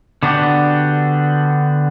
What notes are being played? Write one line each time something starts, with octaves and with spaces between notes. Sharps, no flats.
D3 B3 D4 F#4 G4